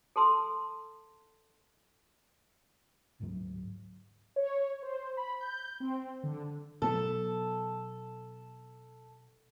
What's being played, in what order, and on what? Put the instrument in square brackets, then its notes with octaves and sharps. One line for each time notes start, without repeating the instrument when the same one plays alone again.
[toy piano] A4 A5 C6 E6
[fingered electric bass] D1 G#2 D3 F#3
[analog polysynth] C#5
C5
B5
G6
C4
D3
[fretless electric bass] B2 F#3 B3 [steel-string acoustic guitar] A4